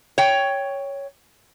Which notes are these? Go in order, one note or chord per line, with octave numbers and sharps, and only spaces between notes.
C#5 G5